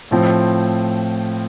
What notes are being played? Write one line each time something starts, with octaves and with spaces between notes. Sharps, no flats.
A2 F3 C4